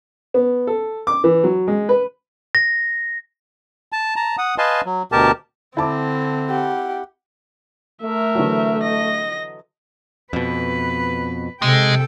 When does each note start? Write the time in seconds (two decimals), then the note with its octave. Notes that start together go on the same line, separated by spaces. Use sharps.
0.34 B3
0.67 A4
1.07 D6
1.24 E3
1.44 F#3
1.68 G#3
1.89 B4
2.55 A#6
3.92 A5
4.16 A5 A#5
4.38 F#5 D#6
4.58 B4 D#5 F5 G#5 A5 C6
4.86 F#3
5.12 D2 B2 G4 A#4 A5
5.77 D3 C4 E4 A5 D6
6.49 G4 F#5
8.03 A3 A#4 E5
8.35 D3 E3 F#3
8.82 D#5 A#6
10.33 F2 B2 B4
11.62 C3 G#3 A4 G5